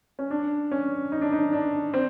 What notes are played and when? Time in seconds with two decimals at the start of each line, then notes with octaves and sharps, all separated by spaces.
0.19 C#4
0.31 D4
0.71 C#4
1.12 D#4
1.21 D4
1.32 D#4
1.53 D4
1.94 C4